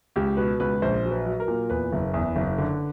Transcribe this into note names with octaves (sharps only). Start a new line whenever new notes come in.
C#2 G4
B2 B4
C#2 B4
A#1 C5
F#3
B4
F#3
A#4
A#2
E2 B4
F#1
E2
F#1
D3